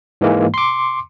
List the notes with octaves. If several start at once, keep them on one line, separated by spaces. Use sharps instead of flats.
G#2 E3 G#3 A#3
C6 D6